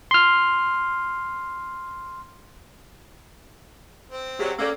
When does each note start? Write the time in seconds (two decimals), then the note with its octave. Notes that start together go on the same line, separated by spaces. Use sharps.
0.11 C6 F6
4.11 C4
4.39 C3 F#3 G4 G#4 D5
4.58 C#3 A#3 C#4 A4 C#5 D5 D6 E6